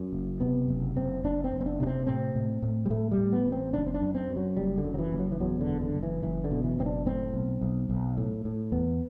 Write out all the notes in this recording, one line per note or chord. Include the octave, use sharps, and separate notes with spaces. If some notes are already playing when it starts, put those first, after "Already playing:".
Already playing: F#2
F#1
C3 B3
F#1
F#1 C4
F#1 D4
C4
F#1
C4
D4
C3 D4
C4
A2 C4
A2
A2
G3
A2 A3
G3
A2
B3
A1
C4
F#1 D4
C4
D4
F#2
C4
F#2
F#3
F#1 G3
D3
F#2
F#3
E3
F#1
F#3
E3
E2 F#3
D3
F#1
D3
F#1
E3
F#1 E3
D3
B2
E3
F#1 C4
D4
A2 C4
B1
B1
B1
A2
A2
E2 B3